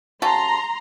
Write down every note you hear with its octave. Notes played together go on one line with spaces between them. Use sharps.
C#3 F#4 A4 A#5 C6